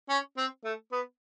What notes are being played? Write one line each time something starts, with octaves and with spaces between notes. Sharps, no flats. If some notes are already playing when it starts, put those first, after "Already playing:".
C#4
C4
A3
B3